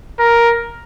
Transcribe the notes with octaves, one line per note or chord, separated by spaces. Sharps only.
A#4